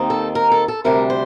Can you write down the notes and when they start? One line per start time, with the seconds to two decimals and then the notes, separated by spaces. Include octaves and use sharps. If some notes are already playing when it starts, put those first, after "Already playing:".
Already playing: D#2 D#3 C4 D#4
0.10 A4
0.35 A#4
0.52 A4
0.68 A4
0.84 D2 C3 G3 D4 A#4
1.10 C5